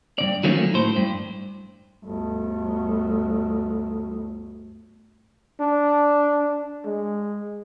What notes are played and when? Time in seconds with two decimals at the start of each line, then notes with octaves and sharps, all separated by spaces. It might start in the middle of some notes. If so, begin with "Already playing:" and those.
0.18 G2 B2 D5
0.43 D#3 F3 F#3 A3 A#3 C#4
0.74 A2 C5
0.96 G2
2.05 G1 D2
5.60 D4
6.85 G#3